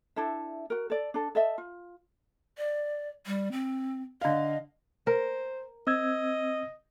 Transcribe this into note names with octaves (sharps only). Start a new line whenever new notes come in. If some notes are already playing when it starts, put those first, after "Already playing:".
D4 E4 A4 E5
F#4 A#4
A4 D5
D4 A4
A4 D#5 E5
F4
D5
G3
C4
D3 D#5 F5
A#4 C5
C4 D#5 E6 G#6